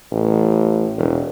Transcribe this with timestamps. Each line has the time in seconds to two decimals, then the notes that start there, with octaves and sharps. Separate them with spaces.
0.11 A1
0.97 E1